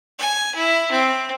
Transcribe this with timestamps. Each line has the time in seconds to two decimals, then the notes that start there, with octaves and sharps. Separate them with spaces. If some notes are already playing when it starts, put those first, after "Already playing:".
0.19 G#5
0.55 E4
0.92 C4